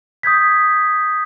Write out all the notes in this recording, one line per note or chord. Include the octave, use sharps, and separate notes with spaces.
D#6 G6 G#6 B6